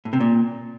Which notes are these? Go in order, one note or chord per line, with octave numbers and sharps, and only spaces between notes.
A2
C3
A#2